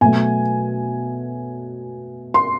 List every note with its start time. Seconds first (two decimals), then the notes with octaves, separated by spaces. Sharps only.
0.01 B2 F#3 A3 G#5
2.34 C6